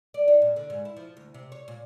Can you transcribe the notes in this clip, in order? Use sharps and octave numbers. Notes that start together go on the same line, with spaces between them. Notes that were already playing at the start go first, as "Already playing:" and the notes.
D5
D#4
A#2
D3
G#2
E4
F3
D2
C3
C#5
A#2